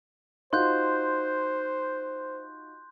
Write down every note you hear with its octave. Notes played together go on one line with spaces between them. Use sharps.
D#4 F4 F#4 C5 C6 F#6 G6